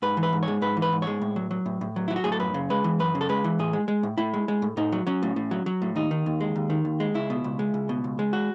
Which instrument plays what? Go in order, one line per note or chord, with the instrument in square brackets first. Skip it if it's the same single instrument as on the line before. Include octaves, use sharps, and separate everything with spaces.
[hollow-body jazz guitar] G#2 B4
E3
B4
G#2
C#5
G#3
G#2 B4
E3
B4
G#2
G#3 C#5
A2
F#3
F#3
A2
A2
F#3
F#3 E4
F#4
A2 G#4
A4
F#2 B4
C#3
G#3 B4
E3
F#2 B4
C#3
A4
G#3 B4
E3
A2 G#4
G#3
G#3
A2
A2 E4
G#3
G#3
A2
A2 D#4
F#3
F#3 C#4
A2
A2
F#3
F#3
A2
D#2 D#4
D#3
D#2
G#3
D#2
D#3
D#2
G#3
C#2 E4
B2
C#2
G#3
C#2
B2
C#2
G#3
F#4